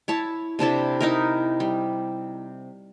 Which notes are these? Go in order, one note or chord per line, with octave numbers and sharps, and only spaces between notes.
E4 C#5 A5
C3 D4 E4 A4
D#4 E4 A#4
G3